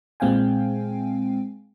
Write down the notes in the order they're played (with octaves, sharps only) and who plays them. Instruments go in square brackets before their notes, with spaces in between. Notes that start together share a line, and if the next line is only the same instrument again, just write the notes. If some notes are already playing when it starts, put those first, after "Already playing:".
[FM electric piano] A#2 G#3 C4 F5 G5 G#5